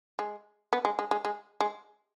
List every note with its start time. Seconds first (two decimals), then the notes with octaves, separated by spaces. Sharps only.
0.19 G#3
0.73 B3
0.85 G#3
0.99 G#3
1.11 G#3
1.25 G#3
1.60 G#3